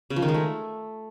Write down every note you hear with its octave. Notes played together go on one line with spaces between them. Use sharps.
C#3
F3
D#3
G#3
A3